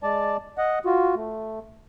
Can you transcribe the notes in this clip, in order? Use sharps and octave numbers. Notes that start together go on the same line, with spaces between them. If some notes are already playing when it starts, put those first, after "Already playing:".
G#3 D5 A5
D#5 F#5
F4 F#4
A3